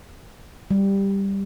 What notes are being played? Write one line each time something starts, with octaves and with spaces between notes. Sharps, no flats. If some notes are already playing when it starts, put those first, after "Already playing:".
G3